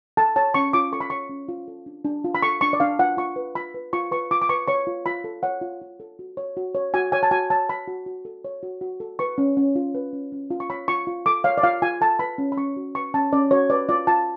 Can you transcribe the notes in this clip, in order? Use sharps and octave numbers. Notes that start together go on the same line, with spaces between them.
A4 A5
C#5 A5
C#4 C#6
F4 D6
A4 C#6
B5
C#5 C#6
C#4
F4
A4
D4
D4
F4
B5
A4 C#6
D4 C#6
D5
D4 F5
F4 F#5
F4 C#6
B4
F4 B5
B4
F4 C#6
B4 C#6
F4 D6
D6
B4 C#6
C#5 C#6
F4
F4 B5
A4
C#5 F#5
F4
F4
A4
F#4
C#5
F#4
C#5
F#4 G#5
C#5 G#5
A5
F#4 G#5
C#5 A5
C#5 B5
F#4
F#4
A4
C#5
F#4
F#4
A4
B4 C#6
C#4
C#4
F4
B4
C#4
C#4
F4
C#6
C#5 B5
F4 C#6
F4
A4 D6
C#5 F5
D5
F4 F5
F4 G#5
A4 A5
B4 B5
C#4
B5
C#4 C#6
F#4
B4 C#6
C#4 A5
C#4 D5
F#4 C#5
B4 D5
F4 D5
F4 A5